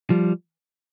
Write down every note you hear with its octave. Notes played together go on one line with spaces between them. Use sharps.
F3 G3